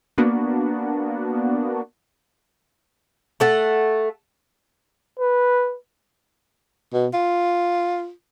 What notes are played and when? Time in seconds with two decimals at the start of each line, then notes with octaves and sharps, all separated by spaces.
0.18 A#3 B3 D4 F#4
3.40 A3 A4 F#5
5.19 B4
6.93 B2
7.14 F4